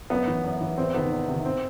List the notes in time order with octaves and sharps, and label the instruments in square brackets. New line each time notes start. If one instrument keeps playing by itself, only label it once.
[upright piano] F#2 B3
E3
F#2
E3
E2 C4
C3 D#3 B3
E2
C3 D#3
C4